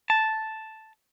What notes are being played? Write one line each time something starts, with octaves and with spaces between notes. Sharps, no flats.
A5